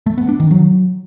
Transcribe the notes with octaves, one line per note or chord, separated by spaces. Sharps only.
A3
B3
D4
D#3
F#3